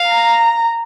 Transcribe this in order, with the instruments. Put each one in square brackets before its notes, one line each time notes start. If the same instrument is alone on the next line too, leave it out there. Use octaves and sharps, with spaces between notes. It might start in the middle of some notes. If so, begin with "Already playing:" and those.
Already playing: [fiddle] F5
[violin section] A#5